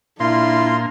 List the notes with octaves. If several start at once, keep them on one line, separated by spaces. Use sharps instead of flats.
A#2 A#3 D4 E4 F4 C6